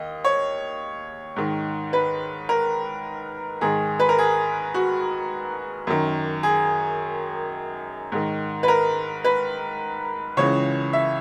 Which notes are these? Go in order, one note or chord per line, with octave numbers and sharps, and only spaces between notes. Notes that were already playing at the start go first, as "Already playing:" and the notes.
Already playing: D#2 D#5
C#5
G#2 D#3
B4
A#4
G#2 D#3 G#4
B4
A#4
G#4
F#4
F#2 D#3
G#4
G#2 D#3
B4
A#4
B4
C#2 C#3 E3 C#5
E5